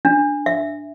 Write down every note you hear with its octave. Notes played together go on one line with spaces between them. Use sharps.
D4
E5